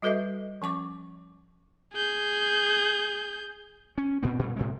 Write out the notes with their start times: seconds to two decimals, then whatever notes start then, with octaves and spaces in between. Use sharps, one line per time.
0.02 G3 F#4 A4 B4 D#5 E5
0.62 F3 C#4 C#6 D6
1.93 G#4 G6
3.98 C#4
4.23 A#2 B3 C4
4.39 A#2 G3
4.56 A2 C3 G#3